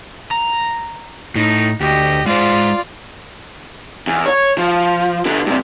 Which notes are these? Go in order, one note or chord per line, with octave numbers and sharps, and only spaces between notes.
A#5
A2 D#4
D2 G4 D#5
G#3 F4 C5 D5
E2
C#5
F3
D3 B3
G2 C3